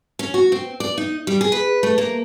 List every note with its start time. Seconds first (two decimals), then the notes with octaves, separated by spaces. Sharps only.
0.19 C#4
0.34 F#4
0.52 C4
0.80 D5
0.98 D#4
1.27 G3
1.41 G#4
1.52 B4
1.83 A3
1.98 A#3